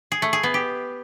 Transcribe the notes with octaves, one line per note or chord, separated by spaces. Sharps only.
G#4
A3
G#4
B3
G4